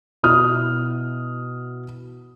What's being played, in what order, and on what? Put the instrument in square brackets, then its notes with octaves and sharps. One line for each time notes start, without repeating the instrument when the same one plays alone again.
[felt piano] B2 E4 D#6 F6